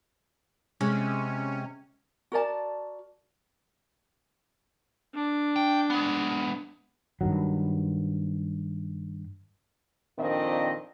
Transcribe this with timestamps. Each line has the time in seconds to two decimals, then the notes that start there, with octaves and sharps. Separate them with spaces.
0.81 C3 G#3 C#4
2.32 F#4 A#4 D5 A5
5.15 D4
5.56 G5
5.90 G#3 B3
7.21 G2 D#3 F#3
10.19 F2 A#2 D#3 C4 D4 D#5